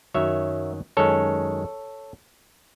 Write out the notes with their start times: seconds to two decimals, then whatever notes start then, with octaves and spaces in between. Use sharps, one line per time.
0.14 F#2 D#3 F#3 C#5 E5
0.97 F#2 D#3 G#3 C#4 A4 C#5